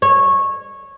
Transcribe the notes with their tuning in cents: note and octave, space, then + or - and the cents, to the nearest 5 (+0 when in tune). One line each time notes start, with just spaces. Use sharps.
C#5 -15